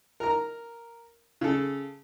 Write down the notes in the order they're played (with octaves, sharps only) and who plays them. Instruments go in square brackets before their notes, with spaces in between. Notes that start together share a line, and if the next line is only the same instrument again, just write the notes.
[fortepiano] A#4 A#5
C#3 A4